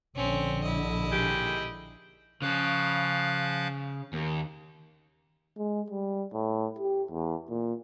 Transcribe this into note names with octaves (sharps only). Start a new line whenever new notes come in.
A#1 D3 C4 C#4
E4 D#5
D#2 G#3 G4
C#3 F3 F5 F#6
D#2
G#3
G3
A2
G4
E2
A#2